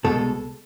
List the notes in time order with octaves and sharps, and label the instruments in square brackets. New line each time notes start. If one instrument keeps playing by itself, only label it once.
[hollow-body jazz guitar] C2 B2 G#3 A4